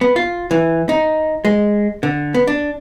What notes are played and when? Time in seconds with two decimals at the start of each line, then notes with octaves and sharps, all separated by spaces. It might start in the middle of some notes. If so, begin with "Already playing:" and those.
0.01 B3
0.16 F4
0.51 E3
0.89 D#4
1.45 G#3
2.03 D3
2.34 B3
2.47 D4